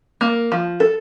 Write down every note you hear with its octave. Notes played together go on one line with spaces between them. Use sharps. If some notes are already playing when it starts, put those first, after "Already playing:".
A#3
F3
A4